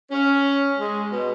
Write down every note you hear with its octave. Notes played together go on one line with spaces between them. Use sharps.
C#4
G#3
B2